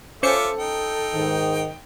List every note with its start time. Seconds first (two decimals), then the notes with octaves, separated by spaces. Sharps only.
0.23 C#4 F4 A4 C5 E5 D6 C#7
0.59 D#4 G5
1.13 G#2 D#3